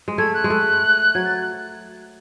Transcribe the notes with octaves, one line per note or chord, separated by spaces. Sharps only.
G#3
A3 G#6
F#6
G#3
A3
F#3 G#6
A6